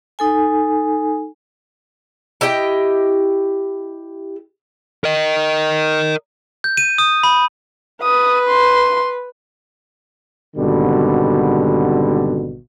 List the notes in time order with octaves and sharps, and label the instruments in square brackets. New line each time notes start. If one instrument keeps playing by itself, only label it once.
[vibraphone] D#4 A4 G#5
[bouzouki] E4 G4 D#5 G5
[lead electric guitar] A#4 D#5
[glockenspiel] G6
D#7
D#6
B5
[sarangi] B4 [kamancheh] D#6
[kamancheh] C6
[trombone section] G#1 B2 D3 G3